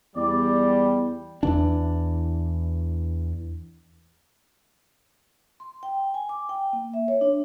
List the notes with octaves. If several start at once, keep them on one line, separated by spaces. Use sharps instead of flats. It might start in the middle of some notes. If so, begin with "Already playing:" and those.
E2 G3 D5
E2 E3 D4
C6
G5
G#5
D6
G5
A#3
E5
C#5
D4